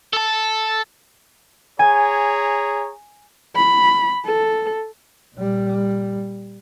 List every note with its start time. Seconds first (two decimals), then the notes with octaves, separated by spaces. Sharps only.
0.13 A4 A5
1.79 G#4 C#5 G#5 A#5
3.56 B5
4.26 A4
5.35 A#2 G3